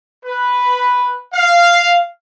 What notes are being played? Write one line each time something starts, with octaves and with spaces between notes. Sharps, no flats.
B4
F5